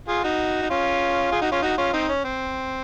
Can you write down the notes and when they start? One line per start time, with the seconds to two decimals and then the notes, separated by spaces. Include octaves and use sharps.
0.08 F4 G#4
0.24 D#4 F#4
0.62 D#4
0.70 C#4 F4
1.31 F4 G#4
1.42 D#4 F#4
1.52 C#4 F4
1.62 D#4 F#4
1.78 C#4 F4
1.93 C4 D#4
2.09 C#4
2.24 C4